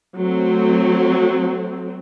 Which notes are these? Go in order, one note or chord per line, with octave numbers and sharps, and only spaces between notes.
F#3 A3 C4